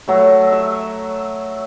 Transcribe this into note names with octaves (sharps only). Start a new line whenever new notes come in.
F#3 A3
E5